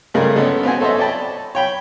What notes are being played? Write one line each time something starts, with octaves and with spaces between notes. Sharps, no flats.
G2 C#3 G#3 A3 A#4
D3 G#3 B3 C#4 A4
B3 C4 F#4 G#5
A4 C5 C#5 D#5 E5
D5 G5 A5 B5
C#5 G5 B5